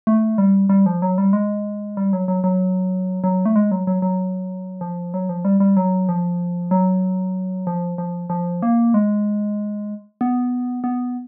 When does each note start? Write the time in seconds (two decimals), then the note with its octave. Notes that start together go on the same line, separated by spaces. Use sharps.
0.07 A3
0.38 G3
0.69 G3
0.86 F3
1.02 F#3
1.18 G3
1.33 G#3
1.97 G3
2.13 F#3
2.28 F#3
2.44 F#3
3.24 F#3
3.45 A3
3.56 G#3
3.71 F#3
3.87 F#3
4.02 F#3
4.81 F3
5.14 F#3
5.29 F3
5.45 G3
5.60 G3
5.77 F#3
6.09 F3
6.71 F#3
7.67 F3
7.98 F3
8.30 F3
8.62 A#3
8.94 G#3
10.21 B3
10.84 B3